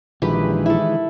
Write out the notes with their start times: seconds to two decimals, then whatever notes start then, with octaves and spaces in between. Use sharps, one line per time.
0.22 A#1 D#3 E3 G#3 G4 B4
0.66 E4 A4